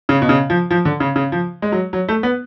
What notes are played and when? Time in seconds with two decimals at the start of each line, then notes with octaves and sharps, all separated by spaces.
0.09 C#3
0.22 B2
0.29 C#3
0.50 F3
0.71 F3
0.85 D3
1.00 C#3
1.16 C#3
1.32 F3
1.62 G#3
1.72 F#3
1.93 F#3
2.08 A3
2.23 B3